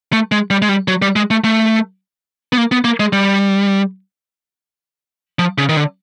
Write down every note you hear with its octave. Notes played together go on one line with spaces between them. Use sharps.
A3
G#3
G3
G#3
G3
F#3
G3
G#3
A3
A3
B3
A#3
B3
A#3
G#3
G3
F3
C#3
D#3
D3